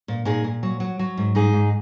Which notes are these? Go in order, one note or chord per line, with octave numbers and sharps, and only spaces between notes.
A#2
A#2 D#4 G#4
A#2
F#3
F#3
F#3
G#2
G#2 D#4 G#4
G#2